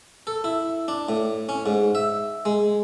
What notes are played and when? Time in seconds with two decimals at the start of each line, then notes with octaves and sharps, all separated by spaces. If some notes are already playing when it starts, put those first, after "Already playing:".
0.27 A4
0.44 E4
0.88 D4
1.09 A2
1.49 C#4
1.66 G#2
1.95 E5
2.45 G#3